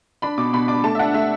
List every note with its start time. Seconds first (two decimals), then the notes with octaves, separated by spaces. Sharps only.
0.22 D4 B5
0.38 B2 D6
0.53 B2 B5
0.68 D4 D6
0.84 A3 A5
0.95 E5
0.99 D4 F#5
1.14 A3 E5